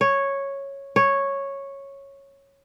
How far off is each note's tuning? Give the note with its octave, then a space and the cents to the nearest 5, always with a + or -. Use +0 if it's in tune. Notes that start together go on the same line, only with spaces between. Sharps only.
C#5 -5
C#5 -5